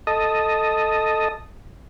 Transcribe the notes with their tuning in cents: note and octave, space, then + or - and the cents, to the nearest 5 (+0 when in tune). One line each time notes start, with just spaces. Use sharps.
A4 +0 D#5 +0